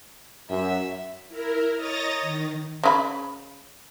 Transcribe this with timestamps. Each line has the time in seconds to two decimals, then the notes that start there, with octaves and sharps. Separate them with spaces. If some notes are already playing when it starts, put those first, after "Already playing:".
0.50 F#2 E5
1.28 E4 A#4
1.75 C#5 D#5 A#5 D#6 A6 A#6
2.21 D#3
2.83 C#3 E4 B5